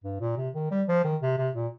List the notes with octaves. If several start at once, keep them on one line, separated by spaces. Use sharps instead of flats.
G2
A#2
C3
D#3
G3
F3
D#3
C3
C3
A#2